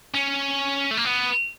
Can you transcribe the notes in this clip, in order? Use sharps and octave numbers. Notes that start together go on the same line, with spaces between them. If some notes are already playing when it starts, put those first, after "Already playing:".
C#4
A3
A#3
B3